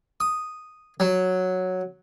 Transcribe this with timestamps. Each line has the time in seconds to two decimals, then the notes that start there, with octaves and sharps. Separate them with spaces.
0.20 D#6
1.00 F#3